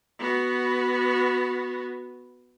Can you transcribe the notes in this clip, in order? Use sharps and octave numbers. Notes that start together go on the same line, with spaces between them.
B3 F#4